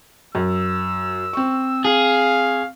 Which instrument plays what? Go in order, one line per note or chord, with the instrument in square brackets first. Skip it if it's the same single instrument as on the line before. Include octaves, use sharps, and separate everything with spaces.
[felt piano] F#2 [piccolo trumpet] E6
[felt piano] C4 C#6
[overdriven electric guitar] G#4 [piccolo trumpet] F5